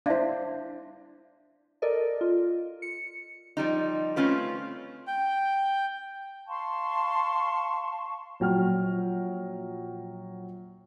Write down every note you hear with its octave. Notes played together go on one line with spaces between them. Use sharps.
D4 E4 C5 E5 F5
A4 A#4 D5 D#5
F4
C#7
F3 G3 D#4
A3 C4 C#4 F4 B4
G5
F5 A5 C6 C#6
A#1 F#3 G5 F6